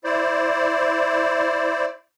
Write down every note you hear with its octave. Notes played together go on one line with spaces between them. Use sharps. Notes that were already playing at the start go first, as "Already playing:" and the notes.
E4 C5 D5